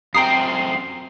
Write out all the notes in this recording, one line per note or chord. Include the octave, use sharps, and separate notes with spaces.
F#2 C4 G5 A#5 D#6 C7